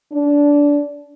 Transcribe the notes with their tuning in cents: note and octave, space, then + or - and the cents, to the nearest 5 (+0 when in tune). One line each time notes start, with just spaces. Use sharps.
D4 -20